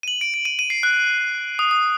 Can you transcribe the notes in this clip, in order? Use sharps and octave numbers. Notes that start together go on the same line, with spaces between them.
D#7
F#7
D7
D7
D#7
D#7
C7
F#6
D#6
D#6